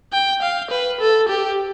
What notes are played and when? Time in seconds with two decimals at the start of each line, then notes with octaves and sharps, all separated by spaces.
0.13 G5
0.42 F5
0.70 B4
1.00 A4
1.28 G4